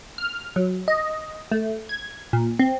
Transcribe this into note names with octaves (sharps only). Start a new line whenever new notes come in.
F6
F#3
D#5
A3
G#6
A#2
C4